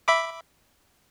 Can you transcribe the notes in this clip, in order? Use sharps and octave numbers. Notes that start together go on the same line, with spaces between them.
E5 B5 D6